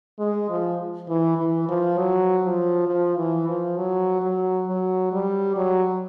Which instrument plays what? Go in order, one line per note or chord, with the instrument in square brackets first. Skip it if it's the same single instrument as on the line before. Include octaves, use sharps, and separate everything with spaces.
[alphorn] G#3
F3
E3
E3
F3
F#3
F3
F3
E3
F3
F#3
F#3
F#3
G3
F#3